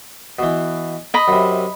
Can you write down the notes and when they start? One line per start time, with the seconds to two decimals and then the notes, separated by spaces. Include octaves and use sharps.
0.39 B2 E3
1.14 D#5 B5
1.28 F#2 C3